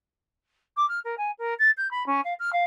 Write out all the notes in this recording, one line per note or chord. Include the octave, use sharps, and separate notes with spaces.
D6
F6
A#4
G#5
A#4
A6
G6
B5
C#4
F5
F6
F5